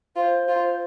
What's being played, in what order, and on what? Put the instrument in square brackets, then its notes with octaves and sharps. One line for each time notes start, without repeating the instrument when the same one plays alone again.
[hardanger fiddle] F4 [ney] C5
[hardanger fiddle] F4